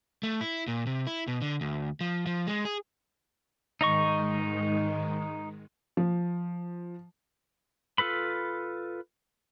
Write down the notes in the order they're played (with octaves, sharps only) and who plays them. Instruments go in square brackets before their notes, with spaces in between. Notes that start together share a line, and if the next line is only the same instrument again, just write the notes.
[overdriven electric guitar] A3
E4
A#2
C3
E4
B2
D3
D2
F3
F3
G#3
G#4
[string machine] G#2 D#3 G#3 [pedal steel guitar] D#4 D#5 C#6
[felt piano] F3
[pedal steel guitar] F4 A4 B4 B5